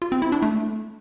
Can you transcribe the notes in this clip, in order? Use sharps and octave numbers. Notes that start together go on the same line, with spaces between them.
F4
C4
E4
D4
A3